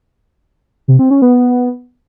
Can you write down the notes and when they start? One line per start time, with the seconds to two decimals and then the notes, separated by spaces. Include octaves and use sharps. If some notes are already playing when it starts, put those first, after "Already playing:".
0.88 C3
0.99 C4
1.11 C#4
1.22 B3